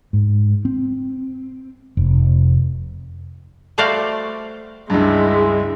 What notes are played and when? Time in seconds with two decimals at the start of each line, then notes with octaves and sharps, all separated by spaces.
0.13 G#2
0.65 C4
1.97 F1
3.78 G3 A3 F#4 C5 D5 F5
4.90 C#2 G2 G#3 E4